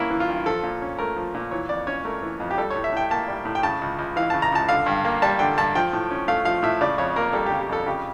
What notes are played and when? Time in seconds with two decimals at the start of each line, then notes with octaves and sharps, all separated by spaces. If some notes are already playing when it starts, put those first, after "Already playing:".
Already playing: G2 A#3 C#4 E4
0.10 E3
0.20 F4
0.29 G2
0.46 F3 A4
0.63 A#2
0.82 C#4
0.98 A3 A#4
1.16 F3
1.34 A#2
1.51 E3 C#5
1.69 F2 D5
1.87 C#4 C#5
2.05 A3 A#4
2.22 E3
2.40 F2
2.51 G4
2.58 G3 A4
2.70 C#5
2.76 A2
2.84 E5
2.92 A2 G5
3.10 A#3 A5
3.28 G3
3.45 A2
3.55 G5
3.63 C#3 A5
3.82 C#2
3.99 C#2
4.16 E3 F5
4.30 C#3 A5
4.42 A#5
4.52 C#2 A5
4.69 D3 F5
4.86 G2
5.05 A#3
5.22 G3 A5
5.39 D3 G5
5.57 G2 A5
5.75 F3 G5
5.93 A2
6.11 C#4
6.28 A3 F5
6.45 F3 F5
6.63 A2 E5
6.81 C#3 D5
6.98 F2 C#5
7.16 A#3 A#4
7.33 G3 A4
7.46 G4
7.51 C#3
7.60 G4
7.69 F2 A4
7.86 C#3 G4